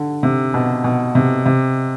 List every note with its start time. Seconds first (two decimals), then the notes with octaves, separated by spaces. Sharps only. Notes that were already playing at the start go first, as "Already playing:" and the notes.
Already playing: D3
0.23 C3
0.54 B2
0.84 B2
1.15 C3
1.46 C3